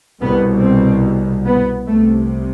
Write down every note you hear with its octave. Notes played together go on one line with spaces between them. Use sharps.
C2 B2 B3
C4
B3
C2 C3 A3